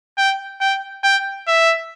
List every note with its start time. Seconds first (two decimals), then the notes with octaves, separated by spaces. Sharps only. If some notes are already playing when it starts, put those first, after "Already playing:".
0.18 G5
0.61 G5
1.04 G5
1.47 E5